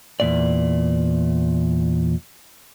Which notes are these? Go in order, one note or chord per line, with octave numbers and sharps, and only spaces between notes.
E2 A#2 D5